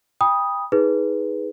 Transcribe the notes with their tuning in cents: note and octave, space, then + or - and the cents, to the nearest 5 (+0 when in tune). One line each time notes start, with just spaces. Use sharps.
G5 +30 B5 -20 D#6 +0
D#4 +25 G#4 +0 B4 +0